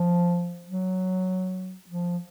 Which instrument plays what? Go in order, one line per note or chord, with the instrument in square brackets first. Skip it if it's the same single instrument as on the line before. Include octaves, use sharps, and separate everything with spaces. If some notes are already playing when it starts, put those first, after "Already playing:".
Already playing: [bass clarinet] F3
F#3
F3